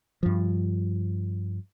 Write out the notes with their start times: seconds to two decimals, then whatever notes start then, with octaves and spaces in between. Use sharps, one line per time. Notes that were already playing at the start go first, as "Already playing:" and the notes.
0.23 G2 F3